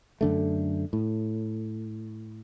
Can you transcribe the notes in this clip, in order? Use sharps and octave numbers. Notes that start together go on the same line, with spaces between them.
F#2 D3 A3
A2